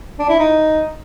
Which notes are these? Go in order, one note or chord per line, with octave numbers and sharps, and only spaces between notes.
D4
E4
D#4